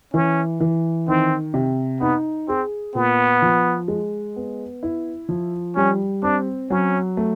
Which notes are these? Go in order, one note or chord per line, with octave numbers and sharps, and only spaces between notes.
E3 C#4
E3
D#3 C4
C3
B3 D#4
C4 G#4
A#2 B3
F3
G#3
B3
E4
F3
G3 C#4
C4 D4
F#3 C#4
A3